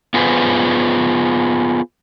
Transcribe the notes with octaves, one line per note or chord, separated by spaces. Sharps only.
B3 F4 G#4 B4 C5